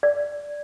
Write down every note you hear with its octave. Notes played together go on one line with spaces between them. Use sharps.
D5